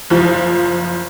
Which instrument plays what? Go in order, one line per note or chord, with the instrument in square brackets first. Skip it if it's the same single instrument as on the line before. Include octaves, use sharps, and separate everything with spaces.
[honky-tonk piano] F#1 F3